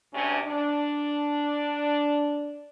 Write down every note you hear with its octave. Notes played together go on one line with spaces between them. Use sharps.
D2 C3 C#4 D4
D4